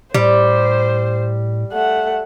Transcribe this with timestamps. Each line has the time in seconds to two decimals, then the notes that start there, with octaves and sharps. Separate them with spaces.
0.14 A2 G3 C5
1.72 A3 F#5